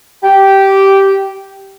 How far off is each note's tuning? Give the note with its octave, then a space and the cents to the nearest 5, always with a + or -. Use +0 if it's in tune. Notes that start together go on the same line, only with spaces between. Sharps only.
G4 -10